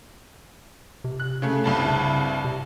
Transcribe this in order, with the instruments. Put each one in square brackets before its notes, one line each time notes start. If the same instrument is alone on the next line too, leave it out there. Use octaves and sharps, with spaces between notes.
[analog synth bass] C3
[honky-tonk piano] F#6
C#3 A3
C2 G2 A5
[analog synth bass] C#3
C3